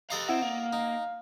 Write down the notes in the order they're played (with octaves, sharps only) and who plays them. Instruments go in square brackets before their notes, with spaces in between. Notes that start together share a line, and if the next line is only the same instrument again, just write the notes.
[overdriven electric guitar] G4 F5 [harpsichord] A4 D#5 A#5
[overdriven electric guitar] C4 [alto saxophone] E4 [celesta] F#5
[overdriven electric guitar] A#3 [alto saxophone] F5
[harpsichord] D#4